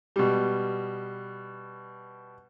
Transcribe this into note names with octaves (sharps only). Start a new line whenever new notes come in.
B2 G3